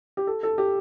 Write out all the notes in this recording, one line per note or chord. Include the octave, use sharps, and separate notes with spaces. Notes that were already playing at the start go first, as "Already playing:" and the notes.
G4
A4
A4
G4